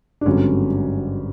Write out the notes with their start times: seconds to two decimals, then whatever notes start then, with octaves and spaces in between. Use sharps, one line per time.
0.21 D4
0.25 G#1 G2 D3 F#3 C#4